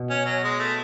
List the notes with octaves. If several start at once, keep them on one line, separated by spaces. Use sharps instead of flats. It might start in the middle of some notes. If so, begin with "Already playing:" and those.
Already playing: B2
C#4
F#3
G#3
A3